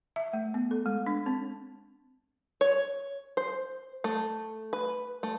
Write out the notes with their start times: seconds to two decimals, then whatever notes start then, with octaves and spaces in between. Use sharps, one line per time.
0.16 E5
0.33 A3
0.54 B3
0.71 A4
0.86 G#3
1.06 D4
1.26 C4
2.61 C#5
3.37 C5
4.04 A3
4.73 B4
5.23 A3